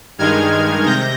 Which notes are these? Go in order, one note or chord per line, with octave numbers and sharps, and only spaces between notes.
G2 D#3 G#3 D#4 F6 G#6
C3 G6 A#6